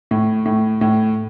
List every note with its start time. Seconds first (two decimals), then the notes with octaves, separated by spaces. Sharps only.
0.11 A2
0.46 A2
0.81 A2